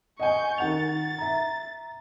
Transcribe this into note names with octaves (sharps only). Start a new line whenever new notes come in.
D#5 F#5 G#5 C#6 G6
D#3 F#5 A6 F7
E5 A#5